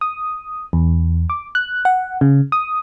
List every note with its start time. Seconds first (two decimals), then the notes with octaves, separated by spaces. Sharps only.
0.01 D#6
0.73 E2
1.30 D6
1.55 F#6
1.85 F#5
2.21 C#3
2.52 D#6